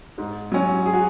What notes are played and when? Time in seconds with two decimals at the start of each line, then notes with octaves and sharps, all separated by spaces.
0.18 G#2
0.52 F#3 C#4
0.86 G#4
0.93 F#4